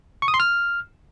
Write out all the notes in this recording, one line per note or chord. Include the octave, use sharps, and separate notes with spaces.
C#6
D#6
C6
F6